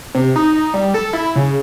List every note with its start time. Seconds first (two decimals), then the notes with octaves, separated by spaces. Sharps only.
0.15 C3
0.36 D#4
0.53 D#4
0.74 G3
0.94 A4
1.13 E4
1.36 C#3